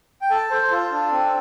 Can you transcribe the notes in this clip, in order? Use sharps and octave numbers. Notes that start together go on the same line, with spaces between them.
G5
A4 A5
A4 C5
F4 A4
D4
C4